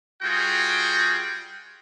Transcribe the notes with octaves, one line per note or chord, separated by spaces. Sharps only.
G3 F4 F#4 G#4 G5